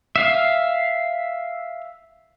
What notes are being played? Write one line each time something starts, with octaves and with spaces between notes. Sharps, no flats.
E5 F5